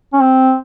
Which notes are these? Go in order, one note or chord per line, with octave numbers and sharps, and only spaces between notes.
C#4
C4